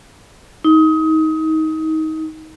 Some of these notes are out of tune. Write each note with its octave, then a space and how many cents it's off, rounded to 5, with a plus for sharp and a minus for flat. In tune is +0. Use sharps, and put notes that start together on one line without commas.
D#4 +25